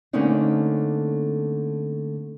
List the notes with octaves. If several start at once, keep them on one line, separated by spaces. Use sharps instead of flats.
D3 A3 A#3 C4 C#4 D#4